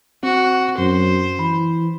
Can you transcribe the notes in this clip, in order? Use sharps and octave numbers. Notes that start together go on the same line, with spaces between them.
C4 F#4
F#2 C5
E3 B5